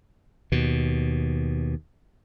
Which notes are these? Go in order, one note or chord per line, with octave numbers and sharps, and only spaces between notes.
D#2 B2